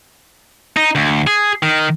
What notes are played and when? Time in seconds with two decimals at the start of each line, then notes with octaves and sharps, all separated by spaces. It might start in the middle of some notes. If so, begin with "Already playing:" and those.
0.77 D#4
0.95 D2
1.27 G#4
1.63 D#3